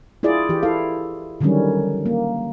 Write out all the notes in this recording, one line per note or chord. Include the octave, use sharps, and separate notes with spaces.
E4 F4 G#4 D5
E3 G4
E4 A4 F5
D3 D#3 F#3 G3 C#4
A#3